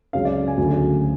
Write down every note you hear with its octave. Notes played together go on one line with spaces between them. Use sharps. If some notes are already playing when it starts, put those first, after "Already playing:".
C#2 C#3 F#3 C#4 F5
D5
G#5
D2 D3 F#3 C#4